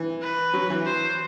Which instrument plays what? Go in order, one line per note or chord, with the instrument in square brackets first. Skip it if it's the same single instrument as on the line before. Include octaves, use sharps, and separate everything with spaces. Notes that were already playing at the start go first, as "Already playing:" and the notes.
Already playing: [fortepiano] E3
[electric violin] B4
[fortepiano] F#3
E3
[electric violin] C5